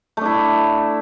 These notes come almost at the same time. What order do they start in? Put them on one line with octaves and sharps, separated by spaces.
A3 D4 E4